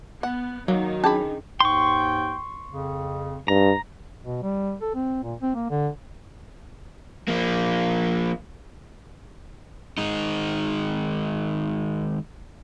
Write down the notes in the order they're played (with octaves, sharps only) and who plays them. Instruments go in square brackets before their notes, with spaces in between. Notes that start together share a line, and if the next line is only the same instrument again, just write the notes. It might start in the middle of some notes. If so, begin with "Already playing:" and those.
[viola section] B3 [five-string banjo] F#5
[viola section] D#3 D#4 [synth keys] F#3 [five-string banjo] A#3
[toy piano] C#4 D4 G#4 [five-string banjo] A5 B5
[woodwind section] D#2 G#2 G5 [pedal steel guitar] C6 C#6
[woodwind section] F2 C#3
[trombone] G2 [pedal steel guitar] A#5
[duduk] B2
G3
A4
C4
A#2
C4
A#3
D3
[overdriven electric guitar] F3 A#3
[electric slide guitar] D#3 G#3 D#4